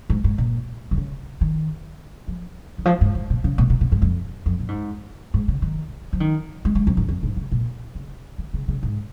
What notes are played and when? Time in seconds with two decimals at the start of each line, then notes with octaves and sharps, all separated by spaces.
0.10 G#2
0.24 G#2
0.38 A#2
0.91 D#3
0.97 C#3
1.41 D#3
2.28 F3
2.78 D#3
2.85 F3
3.01 G#2
3.15 G#2
3.30 A#2
3.44 C#3
3.58 A#2
3.70 A#2
3.81 A#2
3.92 G#2
4.02 F2
4.46 F2
4.60 A#2
4.68 G#2
5.34 G#2
5.48 C#3
5.62 D#3
6.13 F3
6.20 D#3
6.65 G#3
6.75 G#3
6.87 F2
6.97 G#2
7.08 F2
7.23 G#2
7.37 C#3
7.52 A#2
7.95 C#3
8.38 D#3
8.54 C#3
8.68 C#3
8.83 G#2